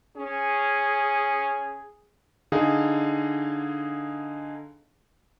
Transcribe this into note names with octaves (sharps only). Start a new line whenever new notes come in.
C#4 G#4
D3 D#4 G#4 F5